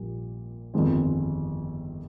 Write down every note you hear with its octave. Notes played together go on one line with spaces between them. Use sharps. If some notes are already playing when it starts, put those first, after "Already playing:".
Already playing: A#1 A#2 G3
G1 F2 D#3 G#3 C4